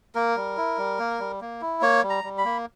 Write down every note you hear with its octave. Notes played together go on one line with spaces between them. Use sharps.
A#3 A#4
G3
E4
G3
A#3
G3
A#3
E4
A#3 C#5
G3
A#5
G3
B5
A#3